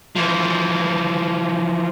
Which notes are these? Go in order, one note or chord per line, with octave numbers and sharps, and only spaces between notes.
E3 F3